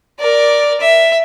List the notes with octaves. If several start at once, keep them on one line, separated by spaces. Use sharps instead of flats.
A#4 D5
E5